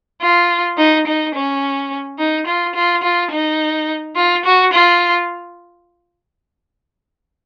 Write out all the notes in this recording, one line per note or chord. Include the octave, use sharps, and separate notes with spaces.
F4
D#4
D#4
C#4
D#4
F4
F4
F4
D#4
F4
F#4
F4